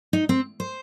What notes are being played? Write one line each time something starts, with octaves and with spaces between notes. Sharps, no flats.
D#4
C4
C5